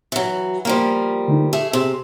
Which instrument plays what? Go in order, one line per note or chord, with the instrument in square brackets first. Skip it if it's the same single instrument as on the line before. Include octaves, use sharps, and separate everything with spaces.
[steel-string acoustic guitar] E3 F#3
F3 G3 A#3
[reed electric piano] D3 A3 D#4
[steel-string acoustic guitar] A3 G#4 [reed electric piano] G4 E5
[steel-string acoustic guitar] C3 [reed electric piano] G#4